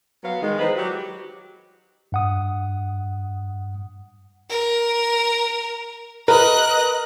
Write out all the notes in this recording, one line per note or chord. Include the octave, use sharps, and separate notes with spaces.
F#3 B3 F5
D#3 G#3
D#3 E3 G#3 D#4 B4 C5
F#3 G4
G2 F#5 D#6
A#4
A#4 B4 D#5 F#6